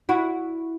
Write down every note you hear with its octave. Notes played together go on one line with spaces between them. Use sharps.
E4 F#4